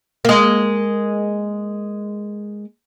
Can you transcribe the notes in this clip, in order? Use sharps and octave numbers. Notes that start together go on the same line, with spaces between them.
G#3 A#3